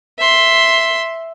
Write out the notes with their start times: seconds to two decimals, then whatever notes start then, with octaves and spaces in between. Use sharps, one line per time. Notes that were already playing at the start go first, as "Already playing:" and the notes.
0.19 E5 C6